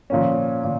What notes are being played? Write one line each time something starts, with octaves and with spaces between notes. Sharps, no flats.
A#2 F3 A#3 C#4
A#2